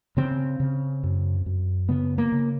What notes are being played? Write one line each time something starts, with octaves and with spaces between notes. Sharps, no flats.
C#3 C4
C#3
F#2
F#2
C#3 B3
A#3
C#3